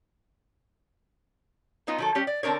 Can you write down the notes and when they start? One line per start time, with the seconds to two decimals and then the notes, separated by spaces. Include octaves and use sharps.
1.87 F#3 B3 D#4 F4
1.98 D#3 F#3 A4
2.15 G3 C#4 G4
2.27 D5
2.43 D3 C4 D4 A#4 C#5